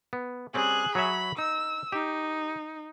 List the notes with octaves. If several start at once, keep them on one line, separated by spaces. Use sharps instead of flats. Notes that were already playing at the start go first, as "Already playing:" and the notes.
B3
G3 C4 C#4 G#4 F#6
F#3 C#5 E5 B5
D#4 E6
D#4 G4